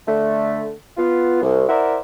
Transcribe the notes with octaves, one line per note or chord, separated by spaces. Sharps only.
D3 A3
B3 F4
C2
E4 A#4 C5 D5 E5 F#5